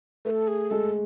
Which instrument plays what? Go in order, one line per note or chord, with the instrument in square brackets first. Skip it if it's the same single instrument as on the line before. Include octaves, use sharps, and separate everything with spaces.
[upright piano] A3 [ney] B4
[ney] A4
G#4
[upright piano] G#3 [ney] A4